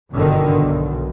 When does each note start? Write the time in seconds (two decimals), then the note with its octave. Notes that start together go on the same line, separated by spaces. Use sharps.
0.11 G1 B2 D3 D#3
0.58 B1